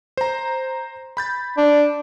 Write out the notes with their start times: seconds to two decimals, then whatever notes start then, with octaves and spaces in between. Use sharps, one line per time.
0.17 C5 A#5
1.17 B5 G6 A6
1.58 D4